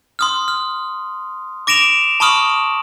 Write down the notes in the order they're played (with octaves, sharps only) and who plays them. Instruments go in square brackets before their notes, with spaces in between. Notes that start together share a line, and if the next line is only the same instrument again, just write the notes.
[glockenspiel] C6 D#6 F6
F6
D6 A#6 D7 E7 F7
A5 B5 C#6 D#6 F6 F#7